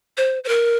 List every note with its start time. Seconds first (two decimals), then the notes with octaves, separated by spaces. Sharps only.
0.17 C5
0.44 C5
0.49 A#4